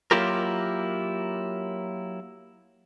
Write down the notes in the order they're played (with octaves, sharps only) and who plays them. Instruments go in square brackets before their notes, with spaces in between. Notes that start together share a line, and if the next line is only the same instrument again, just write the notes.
[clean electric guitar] F#3 A#3 E4 F4 G4 A#4